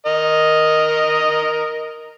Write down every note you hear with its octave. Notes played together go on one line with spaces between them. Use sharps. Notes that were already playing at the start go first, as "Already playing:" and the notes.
A#4 D#5